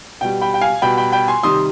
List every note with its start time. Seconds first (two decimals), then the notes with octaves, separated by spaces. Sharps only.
0.21 B2 G3 G5
0.41 G5 B5
0.54 G5
0.61 F5 G#5
0.82 B2 G3 G5 B5
0.97 G5 B5
1.12 G5 B5
1.28 G#5 C6
1.43 C3 D#3 G3 C6 D#6